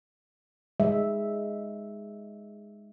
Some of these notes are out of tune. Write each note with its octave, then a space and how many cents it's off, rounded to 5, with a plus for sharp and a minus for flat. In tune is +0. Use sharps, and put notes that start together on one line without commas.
G#3 +0 E5 +0